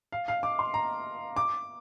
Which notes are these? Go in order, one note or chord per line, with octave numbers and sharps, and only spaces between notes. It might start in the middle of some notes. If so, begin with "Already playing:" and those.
F5
F5
D6
C6
A#5
D6